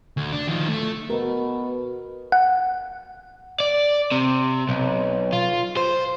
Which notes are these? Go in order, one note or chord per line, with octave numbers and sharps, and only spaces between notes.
D2
D4
D#3 F3
A3
B2 A#4
F#5
D5
C3
B1
F4
C5